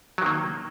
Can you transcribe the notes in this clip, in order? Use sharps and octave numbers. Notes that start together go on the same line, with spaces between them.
D#3 F#3 A#3